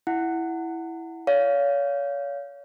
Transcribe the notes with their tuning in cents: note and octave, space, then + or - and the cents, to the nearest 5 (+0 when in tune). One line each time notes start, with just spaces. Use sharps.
E4 +0 F#5 +0
C#5 +35 F5 +0